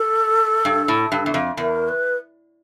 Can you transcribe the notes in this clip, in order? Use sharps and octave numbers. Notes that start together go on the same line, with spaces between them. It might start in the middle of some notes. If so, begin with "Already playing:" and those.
Already playing: A4
G2
A2
G2
E2
F2
E2 A#4
B4